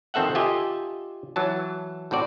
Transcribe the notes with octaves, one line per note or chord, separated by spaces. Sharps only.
F2 D#3 C4 A4 E5 F#5
F4 G4 D#5 E5 G#5
E3 F#3 A5
A2 C4 F#4 D5